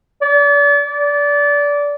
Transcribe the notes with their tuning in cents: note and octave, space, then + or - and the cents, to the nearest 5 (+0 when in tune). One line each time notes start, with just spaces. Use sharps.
D5 -35
D5 -25